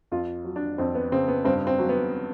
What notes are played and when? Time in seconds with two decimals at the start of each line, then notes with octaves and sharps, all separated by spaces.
0.12 F2 F4
0.45 F#3
0.56 D4
0.78 F2 C4
0.95 B3
1.12 C#3 C4
1.28 B3
1.45 G2 C4
1.67 C4
1.79 F#3
1.89 B3